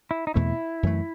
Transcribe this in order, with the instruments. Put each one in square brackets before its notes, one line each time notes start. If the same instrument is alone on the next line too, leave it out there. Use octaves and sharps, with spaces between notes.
[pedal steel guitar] E4
D#4
[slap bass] E2 B2 A3 C4 [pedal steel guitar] E4
[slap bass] F#2 E3 A3